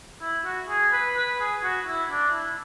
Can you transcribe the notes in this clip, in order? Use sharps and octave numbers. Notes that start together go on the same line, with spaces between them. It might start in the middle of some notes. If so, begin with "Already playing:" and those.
E4
F#4
G#4
B4
B4
G#4
F#4
E4
D4
E4